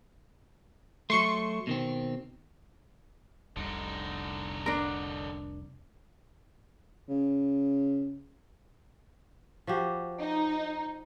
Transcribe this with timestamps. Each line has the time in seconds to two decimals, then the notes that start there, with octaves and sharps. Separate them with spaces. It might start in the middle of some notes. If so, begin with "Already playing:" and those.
1.10 F#3 A3 C6 C#6 C#7
1.67 B2 D#3 C4
3.57 F1 C2 D3 D#4
4.66 D4 A#4
7.09 C#3
9.67 F3 F#4 G4
10.20 D#4